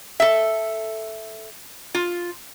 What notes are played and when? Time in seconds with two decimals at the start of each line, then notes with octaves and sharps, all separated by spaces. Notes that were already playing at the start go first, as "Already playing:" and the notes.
0.20 A4 E5
1.94 F4